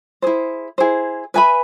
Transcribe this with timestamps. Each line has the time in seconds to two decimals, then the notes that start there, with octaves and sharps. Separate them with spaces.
0.22 E4 G#4 C5
0.78 E4 G#4 C5
1.34 B4 E5 G#5 B5